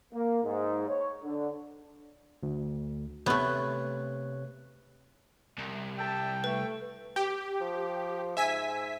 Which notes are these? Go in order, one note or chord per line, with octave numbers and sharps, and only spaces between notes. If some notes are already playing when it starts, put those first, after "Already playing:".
A#3
G#2
C#5
D3
D2
C3 A3 B3 C#5 F#6
C2
E5 G5 A5
A3 B4
G4
F3
G#2 E5 G#5 B6